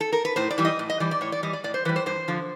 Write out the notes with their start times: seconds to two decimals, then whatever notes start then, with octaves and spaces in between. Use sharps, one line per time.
0.01 A4
0.13 A#4
0.25 B4
0.36 A2 C5
0.51 D5
0.58 E3 G3
0.65 D#5
0.79 A2
0.90 D#5
1.00 E3 G3 D5
1.11 D5
1.21 A2 C#5
1.32 D5
1.43 E3 G3 D#5
1.53 D5
1.64 A2 D5
1.74 C5
1.85 E3 G3 B4
1.96 C5
2.06 G2 C5
2.28 D3 F3